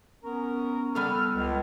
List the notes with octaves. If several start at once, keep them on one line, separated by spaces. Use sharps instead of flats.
B3 C#4 A#4
G3 B3 A4 F6
C#2